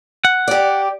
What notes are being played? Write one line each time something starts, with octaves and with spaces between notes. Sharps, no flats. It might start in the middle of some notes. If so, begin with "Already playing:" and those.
F#5
G4 D5